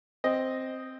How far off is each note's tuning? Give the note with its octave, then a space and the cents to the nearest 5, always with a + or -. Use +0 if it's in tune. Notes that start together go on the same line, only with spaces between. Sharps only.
C4 +0 D#5 +0